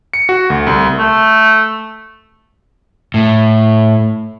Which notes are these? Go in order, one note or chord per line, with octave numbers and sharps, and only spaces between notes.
C#7
F#4
D2
C2
A3
A2